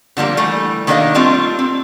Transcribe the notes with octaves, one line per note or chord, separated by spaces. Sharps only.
D3 F3 G3 A#3
E3 G3 A3
D#3 A#3 D4 G4 D#5 F5
G3 A3 C4 D4 F4
C4